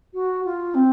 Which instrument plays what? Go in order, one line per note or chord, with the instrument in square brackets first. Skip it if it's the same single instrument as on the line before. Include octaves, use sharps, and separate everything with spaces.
[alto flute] F#4
F4
C4